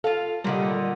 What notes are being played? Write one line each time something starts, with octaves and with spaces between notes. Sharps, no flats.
F4 A4 F5
A#2 D3 G3 D#5